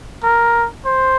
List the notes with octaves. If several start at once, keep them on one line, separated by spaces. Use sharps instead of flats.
A#4
C5